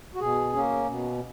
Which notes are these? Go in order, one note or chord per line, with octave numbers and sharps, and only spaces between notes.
F#4
B2 G#4
A#3 C#4
B2